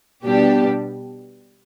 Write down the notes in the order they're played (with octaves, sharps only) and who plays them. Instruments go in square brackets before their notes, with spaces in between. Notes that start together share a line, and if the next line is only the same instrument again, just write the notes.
[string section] B2 G3 B3 D4 G4